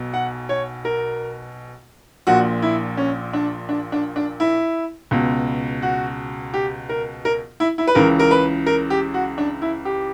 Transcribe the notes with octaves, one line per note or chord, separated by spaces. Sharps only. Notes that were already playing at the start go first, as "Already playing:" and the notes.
Already playing: B1 B2
F#5
C#5
A#4
A#1 A#2 F#4
E4
C#4
D4
D4
D4
D4
E4
C#2 B2
F#4
G4
A#4
A#4
E4
E4
B4
C#2 C#3 E3 A#4
A#4
B4
A#4
G4
F#4
D4
E4
G4